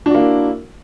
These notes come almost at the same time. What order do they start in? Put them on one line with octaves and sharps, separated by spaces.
D4 F#4 A#3 E4